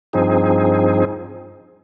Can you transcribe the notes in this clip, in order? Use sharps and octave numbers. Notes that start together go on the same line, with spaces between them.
G2 F3 C4 D#4 G#4